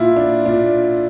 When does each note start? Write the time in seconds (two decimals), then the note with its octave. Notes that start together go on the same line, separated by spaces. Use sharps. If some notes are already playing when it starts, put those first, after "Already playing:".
Already playing: A#2 E4 F4
0.16 D4
0.45 A#2 D4